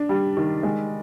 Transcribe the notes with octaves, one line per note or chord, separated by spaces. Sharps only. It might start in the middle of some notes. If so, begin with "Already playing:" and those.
Already playing: D4
G3
D#3
G#3